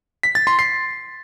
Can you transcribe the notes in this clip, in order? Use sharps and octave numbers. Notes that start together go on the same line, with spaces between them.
B6
A6
C6
C7